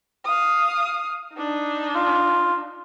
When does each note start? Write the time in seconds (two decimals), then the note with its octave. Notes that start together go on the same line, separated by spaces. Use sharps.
0.25 F5 D#6
1.34 D4 D#4
1.95 F4